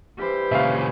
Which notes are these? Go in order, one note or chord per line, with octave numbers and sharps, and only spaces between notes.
G2 E3 G4 C5 B5
A#2 C#3 C#5 E5 F5